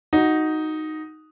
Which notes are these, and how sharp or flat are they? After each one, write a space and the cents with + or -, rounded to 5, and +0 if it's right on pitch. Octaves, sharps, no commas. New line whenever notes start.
D#4 +0 F#4 +0